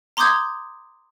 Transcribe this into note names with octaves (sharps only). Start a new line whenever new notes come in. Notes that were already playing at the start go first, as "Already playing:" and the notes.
A#5 C6 D6 D#6 G6 G#6